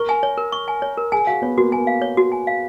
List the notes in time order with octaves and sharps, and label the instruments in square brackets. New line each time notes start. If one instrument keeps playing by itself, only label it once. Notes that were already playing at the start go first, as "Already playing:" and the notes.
Already playing: [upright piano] A#4 [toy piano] C#6
[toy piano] G#5
C#5
A#4
C#6
G#5
C#5
A#4
[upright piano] G#4 [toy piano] G#5
[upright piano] F#4 [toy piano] F5
[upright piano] B3 [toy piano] C#5
[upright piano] A#3 [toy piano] F#4
[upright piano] A#3 [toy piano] G#5
[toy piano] F5
C#5
F#4
G#5
F5